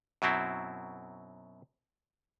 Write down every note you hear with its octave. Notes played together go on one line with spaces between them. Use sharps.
F#2 B2 F#3 C4 E4